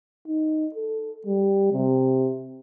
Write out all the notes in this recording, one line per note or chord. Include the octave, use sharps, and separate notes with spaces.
D#4
A4
G3
C3